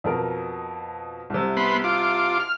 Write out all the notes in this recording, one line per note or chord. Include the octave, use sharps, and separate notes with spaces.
F2 B2 A#4
C2 C3
B3 B5 C6
F4 D6
F6